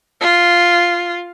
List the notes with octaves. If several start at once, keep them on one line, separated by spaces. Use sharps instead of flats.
F4